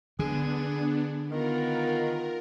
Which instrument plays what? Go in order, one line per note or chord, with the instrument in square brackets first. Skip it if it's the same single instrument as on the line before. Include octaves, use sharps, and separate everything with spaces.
[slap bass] D3 [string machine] B3 D4 [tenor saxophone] G#4
[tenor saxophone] D#3 [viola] B3 F4 [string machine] A#4